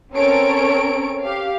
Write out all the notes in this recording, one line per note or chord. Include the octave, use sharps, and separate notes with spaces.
C4 C#4 A4 A#4 C#5 D7
G4 F5